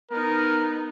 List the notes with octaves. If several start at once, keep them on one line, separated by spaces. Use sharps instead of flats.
B3 D#4 A#4